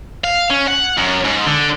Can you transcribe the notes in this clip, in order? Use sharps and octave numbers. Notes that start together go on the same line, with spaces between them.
F5
C#4
F#5
F#2
G#2
D3